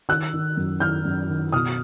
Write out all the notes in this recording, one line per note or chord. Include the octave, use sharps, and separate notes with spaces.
D#3 E6 F#6
D#3
F#2
D#3 F6 G6
F#2
D#3
B2 D#6 F6